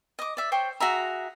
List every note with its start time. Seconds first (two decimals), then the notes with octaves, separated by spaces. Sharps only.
0.19 D#5 D6
0.37 D5 E5
0.52 C5 C#5 G5
0.80 F#4 G#4 E5 A#5